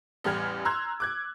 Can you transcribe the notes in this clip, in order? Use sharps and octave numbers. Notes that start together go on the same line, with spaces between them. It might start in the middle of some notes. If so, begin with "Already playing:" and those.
A1 E2 G3 F6 G#6
A#5 C6 E6 F#6 G#6
D6 F#6 G#6